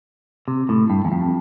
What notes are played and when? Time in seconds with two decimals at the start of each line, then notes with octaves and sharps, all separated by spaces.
0.48 C3
0.69 A2
0.90 G2
1.05 E2
1.12 F2